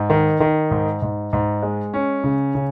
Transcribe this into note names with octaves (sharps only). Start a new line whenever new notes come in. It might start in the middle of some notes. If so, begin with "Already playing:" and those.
Already playing: G#2
D#3
D#3
G#2
G#2
G#2
G#3
C#4
C#3
C#3